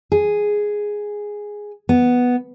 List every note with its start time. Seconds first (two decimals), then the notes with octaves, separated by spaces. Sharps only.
0.12 G#4
1.89 B3